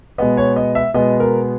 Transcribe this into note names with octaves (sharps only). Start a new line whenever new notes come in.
B2 G#3 B3 D#5
C#5
D#5
E5
B2 G#3 B3 D#5
A#4